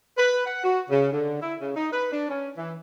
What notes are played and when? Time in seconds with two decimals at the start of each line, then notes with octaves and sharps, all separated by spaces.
0.17 B4
0.46 F#5
0.63 F#4
0.89 C#3
1.12 D3
1.41 E4
1.60 C#3
1.76 D#4
1.91 B4
2.11 D4
2.29 C#4
2.56 E3